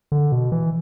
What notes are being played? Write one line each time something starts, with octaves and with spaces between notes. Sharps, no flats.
D3
B2
E3